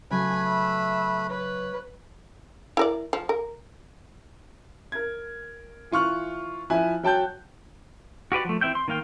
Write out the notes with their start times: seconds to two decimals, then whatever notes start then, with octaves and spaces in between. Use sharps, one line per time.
0.11 C#3 F#3 A3 B4 G#5 B5
0.46 E5
1.30 B4 C#5
2.77 E4 A#4 D5
3.13 F3
3.29 A#4
4.92 A#4 G#6
5.91 E3 F4 C#6 F6 F#6
6.70 F3 E4 E5 G#5 F#6
7.03 F#3 G5 A5 F#6 G6
8.32 F#4 G4 B4 D5
8.45 F3 A3
8.61 E3 C4 E5 G5 G6
8.75 C6
8.88 D#3 A#3 F5 G5